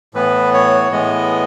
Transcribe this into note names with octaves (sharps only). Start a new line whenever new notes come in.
A2 E3 B3 B4
C#5
A2 E3 G#3 B3 D#5